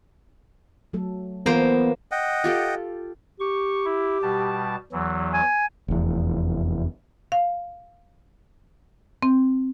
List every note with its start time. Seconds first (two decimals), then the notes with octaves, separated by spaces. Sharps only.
0.93 F#3 A3 A4
1.46 E3 A#3 B3 F4 A4 C5
2.11 D#5 F#5 G5
2.44 F4 G4 A4
3.40 G4 C#6
3.85 E4
4.22 B2 G3 A5
4.92 E2 E3 F#3
5.33 G#5
5.88 F1 E2
7.32 F5
9.23 C4